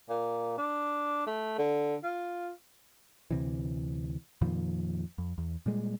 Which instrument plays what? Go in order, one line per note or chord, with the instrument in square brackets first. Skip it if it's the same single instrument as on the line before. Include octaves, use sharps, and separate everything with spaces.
[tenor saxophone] A#2
D4
A3
D3
F4
[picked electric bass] D2 C3 E3
F2 A#2 D#3 F3
F2
E2
A#2 G3 G#3